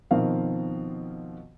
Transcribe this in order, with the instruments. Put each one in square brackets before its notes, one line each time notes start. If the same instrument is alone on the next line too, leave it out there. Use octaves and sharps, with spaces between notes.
[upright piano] B2 D#3 F3 C4 A#4 F5